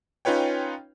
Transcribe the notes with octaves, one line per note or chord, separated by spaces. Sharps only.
C#4 D#4 F4 B4 C#5 G5